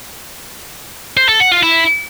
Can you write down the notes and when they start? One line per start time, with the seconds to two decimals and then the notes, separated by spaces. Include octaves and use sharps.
1.17 C5
1.29 A4
1.40 F#5
1.52 F4
1.63 E4